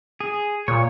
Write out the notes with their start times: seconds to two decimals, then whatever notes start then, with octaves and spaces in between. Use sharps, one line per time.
0.21 G#4
0.68 A#2 C#5